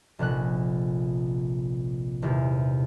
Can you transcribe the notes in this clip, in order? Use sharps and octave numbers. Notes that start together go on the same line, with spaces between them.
F1 A#1 A#2 F#6
D#1 E2 C3